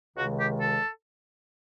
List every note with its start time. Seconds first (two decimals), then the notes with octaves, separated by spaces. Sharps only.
0.16 C#2 C3 D#3 G#3 F#4
0.40 G4
0.61 A4